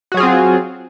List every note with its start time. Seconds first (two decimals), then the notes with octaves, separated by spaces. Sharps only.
0.12 F#4
0.14 F#3
0.17 G#4
0.20 F4
0.23 C4